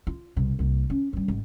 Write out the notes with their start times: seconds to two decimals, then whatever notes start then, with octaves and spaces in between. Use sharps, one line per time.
0.07 F4
0.36 C2 B2
0.59 C2 A#3
0.90 C#4
1.13 G2 G3
1.28 G#1